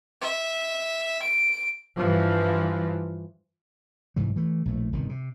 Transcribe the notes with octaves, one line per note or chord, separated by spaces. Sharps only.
E5
D7
G2 E3 F3
C2 G#2 E3 F#3
E3 A3
A#1 A2 A3
G1 C3 D#3
C3